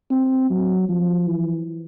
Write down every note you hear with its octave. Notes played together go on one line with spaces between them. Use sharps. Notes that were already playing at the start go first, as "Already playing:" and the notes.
C4
F#3
F3
E3